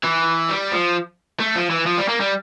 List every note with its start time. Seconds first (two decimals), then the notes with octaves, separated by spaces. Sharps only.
0.03 E3
0.49 G3
0.72 F3
1.40 A3
1.56 F3
1.70 E3
1.86 F3
1.98 G3
2.09 A#3
2.21 G3